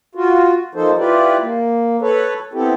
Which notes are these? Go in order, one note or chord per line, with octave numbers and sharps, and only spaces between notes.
F4 F#4
F3 A#3 D#4 A4 C5
E4 F4 G4 B4 D5
A#3
A4 B4 C#5
B3 C4 E4 G4 A4